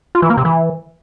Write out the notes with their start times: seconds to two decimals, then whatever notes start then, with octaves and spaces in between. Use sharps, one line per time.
0.15 F4
0.22 E3
0.30 A#3
0.37 C3
0.45 E3